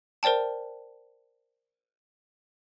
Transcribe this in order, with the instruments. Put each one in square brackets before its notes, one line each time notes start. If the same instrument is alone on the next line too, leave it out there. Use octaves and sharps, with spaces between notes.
[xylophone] A#4 C5 D5 G5 A5